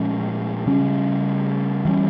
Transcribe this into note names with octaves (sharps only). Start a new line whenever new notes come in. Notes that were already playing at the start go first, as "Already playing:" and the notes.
Already playing: A#2 F3 G#3 C#4
C#3 G3 C#4
E3 G3 C#4